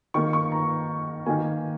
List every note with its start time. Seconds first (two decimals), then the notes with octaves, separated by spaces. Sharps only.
0.14 D#3 A#3 C#6
0.33 C#6
0.52 A#5
1.26 D#3 A#3 G#5